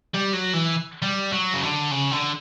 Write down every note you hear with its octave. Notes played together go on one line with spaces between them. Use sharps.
G3
F#3
E3
G3
F#3
C#3
D3
C#3
D3